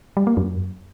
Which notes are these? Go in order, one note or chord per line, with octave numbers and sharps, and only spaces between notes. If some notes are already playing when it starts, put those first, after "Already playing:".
G3
A#3
F#2